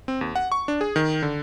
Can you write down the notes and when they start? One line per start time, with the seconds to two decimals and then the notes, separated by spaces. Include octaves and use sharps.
0.08 C4
0.21 D#2
0.35 F#5
0.52 C#6
0.68 D4
0.81 G#4
0.96 D#3
1.22 D3